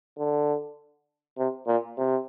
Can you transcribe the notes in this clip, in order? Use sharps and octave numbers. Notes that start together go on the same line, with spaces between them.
D3
C3
A#2
C3